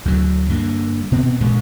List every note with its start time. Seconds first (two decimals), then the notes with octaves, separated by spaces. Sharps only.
0.05 D2 D3 F#3
0.49 G2 D3 A#3
1.12 B2 B3 C4
1.40 A1 G2 A#2 G#3